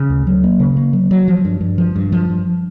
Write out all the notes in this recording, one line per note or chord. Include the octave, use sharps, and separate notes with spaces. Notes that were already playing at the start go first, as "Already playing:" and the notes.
Already playing: C#3
D2
F#3
A#3
C#3
A#3
F#3
F#3
F3
G2
G2
F3
G2
F3
G2